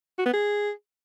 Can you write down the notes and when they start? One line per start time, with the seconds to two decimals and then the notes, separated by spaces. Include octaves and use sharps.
0.18 F#4
0.26 B3
0.33 G#4